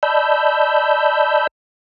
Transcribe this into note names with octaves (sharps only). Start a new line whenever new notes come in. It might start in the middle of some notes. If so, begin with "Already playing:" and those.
D5 D#5 A5 B5 E6 G6